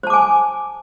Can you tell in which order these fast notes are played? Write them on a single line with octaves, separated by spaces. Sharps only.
C5 A5 D6 G#5